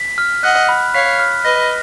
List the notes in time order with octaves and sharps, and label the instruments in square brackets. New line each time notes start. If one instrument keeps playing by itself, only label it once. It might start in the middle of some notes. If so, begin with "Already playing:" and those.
Already playing: [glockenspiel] B6
F6
[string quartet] D#5 F#5 [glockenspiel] F#6
[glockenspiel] B5
[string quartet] C#5 F5 [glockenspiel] B6
[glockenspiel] F6
[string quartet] B4 D#5 [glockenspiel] A#6